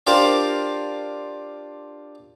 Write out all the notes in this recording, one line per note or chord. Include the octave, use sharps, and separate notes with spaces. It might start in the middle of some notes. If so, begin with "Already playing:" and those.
D4 F4 G4 A#4 C5 D5